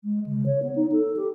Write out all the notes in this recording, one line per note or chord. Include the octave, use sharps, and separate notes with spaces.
G#3
C#3
C#5
B3
D#4
A4
G4